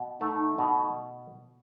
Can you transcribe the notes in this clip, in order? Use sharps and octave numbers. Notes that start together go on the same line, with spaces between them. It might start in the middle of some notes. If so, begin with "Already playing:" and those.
Already playing: B2
A3 D#4
B2